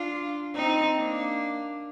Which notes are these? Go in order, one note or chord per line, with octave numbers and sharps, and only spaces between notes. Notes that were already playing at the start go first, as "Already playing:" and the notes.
Already playing: D4 F4
C4 D#4
A#3 D4